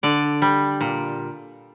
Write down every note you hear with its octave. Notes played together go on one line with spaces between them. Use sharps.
D3 D5
G3
A#2